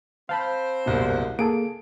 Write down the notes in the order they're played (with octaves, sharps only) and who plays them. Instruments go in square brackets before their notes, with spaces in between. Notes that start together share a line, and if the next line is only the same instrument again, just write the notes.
[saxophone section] C4 C5 [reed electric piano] F5 A5 B5
[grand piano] F#1 C2 B2
[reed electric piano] A#3 G#4 A4 [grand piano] D7